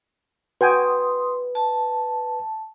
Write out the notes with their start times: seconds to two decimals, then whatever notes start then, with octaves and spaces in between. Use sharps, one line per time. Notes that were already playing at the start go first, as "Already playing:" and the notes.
0.61 F#4 B4 G5 G#5 C6 D#6
1.55 A5